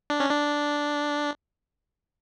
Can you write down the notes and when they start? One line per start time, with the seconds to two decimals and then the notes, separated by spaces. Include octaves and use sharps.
0.10 D4
0.20 C#4
0.30 D4